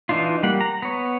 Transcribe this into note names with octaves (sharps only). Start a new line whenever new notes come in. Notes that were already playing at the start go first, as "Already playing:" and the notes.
E3 D4 D#4 F4
G3 A#3 F#5
A#5
B3 C#5